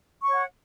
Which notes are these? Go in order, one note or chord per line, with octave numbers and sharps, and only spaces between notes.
C#5 F#5 C#6